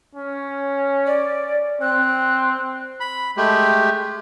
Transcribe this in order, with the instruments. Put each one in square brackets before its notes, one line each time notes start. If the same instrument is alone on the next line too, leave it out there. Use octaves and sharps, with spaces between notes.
[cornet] C#4
[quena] D5
[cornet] C4 [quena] F#6
[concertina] B5
G#3 A3 G4